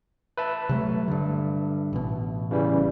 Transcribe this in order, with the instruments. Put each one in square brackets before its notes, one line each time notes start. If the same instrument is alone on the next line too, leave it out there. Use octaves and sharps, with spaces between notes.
[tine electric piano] B4 E5 A5
[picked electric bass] C3 F#3 A3
G2 D3
A1 B2
[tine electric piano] C#3 E3 G3